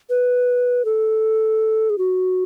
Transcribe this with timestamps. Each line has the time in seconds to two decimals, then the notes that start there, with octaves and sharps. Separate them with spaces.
0.10 B4
0.85 A4
1.90 G#4
1.98 F#4